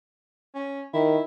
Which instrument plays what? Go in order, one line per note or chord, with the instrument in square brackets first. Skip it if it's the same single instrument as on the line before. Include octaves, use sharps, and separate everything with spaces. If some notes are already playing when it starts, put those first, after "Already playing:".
[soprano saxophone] C#4
[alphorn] D#3 [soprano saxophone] E4